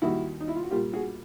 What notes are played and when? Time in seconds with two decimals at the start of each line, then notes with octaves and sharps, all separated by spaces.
0.02 D#2 D#3 G3 A#3 E4 F#4
0.40 D#4
0.48 E4
0.56 F4
0.63 F#4
0.71 A#2 G3 A#3 F4 G4
0.94 F#4 G#4